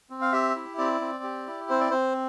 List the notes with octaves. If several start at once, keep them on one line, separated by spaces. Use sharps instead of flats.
C4
F5
G4 E5
E4
C4 D5
C4
G4
E4
C4 C5
D5
C4 C5